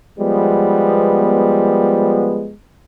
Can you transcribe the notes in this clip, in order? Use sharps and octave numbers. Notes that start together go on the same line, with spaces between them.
F3 G3 G#3 B3